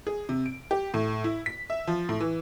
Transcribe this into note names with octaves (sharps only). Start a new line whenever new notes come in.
G#4
C3
D7
G4
A2
E4
B6
E5
F3
A2
E3